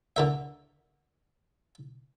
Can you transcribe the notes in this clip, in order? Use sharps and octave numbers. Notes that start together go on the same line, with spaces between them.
D3 A#4 E5